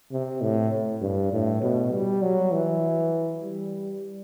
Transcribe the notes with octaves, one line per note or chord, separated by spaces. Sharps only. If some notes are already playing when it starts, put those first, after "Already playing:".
C3
A2
G2
A2
B2
G3
F#3
E3
G3